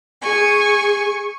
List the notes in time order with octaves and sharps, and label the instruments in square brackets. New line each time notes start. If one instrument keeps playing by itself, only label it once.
[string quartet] G#4 G#5 C#6